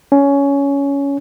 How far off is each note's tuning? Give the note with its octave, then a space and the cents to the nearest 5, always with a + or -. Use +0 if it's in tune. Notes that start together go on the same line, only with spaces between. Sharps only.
C#4 +15